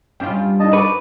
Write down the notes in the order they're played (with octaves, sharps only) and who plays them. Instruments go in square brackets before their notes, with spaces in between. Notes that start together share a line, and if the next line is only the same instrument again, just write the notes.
[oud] G2 F4 [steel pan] C#4 G5
[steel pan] D4 D#4 [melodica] D#5 A5
[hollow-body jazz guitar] B4 [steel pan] C#6 [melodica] D6